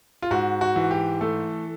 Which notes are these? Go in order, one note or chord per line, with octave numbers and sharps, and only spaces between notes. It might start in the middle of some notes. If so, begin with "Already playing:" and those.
F4
G#2 F#4
F#4
E3
G4
A3 A4